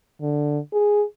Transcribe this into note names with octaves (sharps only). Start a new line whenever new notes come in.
D3
G#4